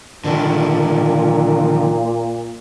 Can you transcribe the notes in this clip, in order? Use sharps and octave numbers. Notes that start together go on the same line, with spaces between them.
A#2 D3 D#3 E4